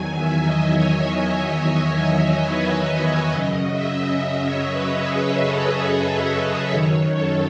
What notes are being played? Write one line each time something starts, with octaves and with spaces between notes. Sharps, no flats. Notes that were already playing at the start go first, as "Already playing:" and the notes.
Already playing: E2 D#3 F#3 G#5
E5
D#5
C#5
B4
C#5
F#2 C#3 F#3 D#5
E5
E5
C#5
B4
G#4
A4
B4
B4
F#2 D#3 F#3 C#5
A4